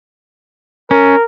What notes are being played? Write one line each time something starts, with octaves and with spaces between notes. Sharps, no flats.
C#4 A#4